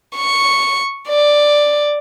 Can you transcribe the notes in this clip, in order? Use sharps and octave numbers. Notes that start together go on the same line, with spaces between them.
C#6
D5